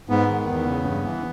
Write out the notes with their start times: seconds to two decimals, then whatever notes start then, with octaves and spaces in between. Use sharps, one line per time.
0.09 G#2 B3
0.29 D#3
0.47 E2
0.66 C#3
0.85 G2
1.04 E3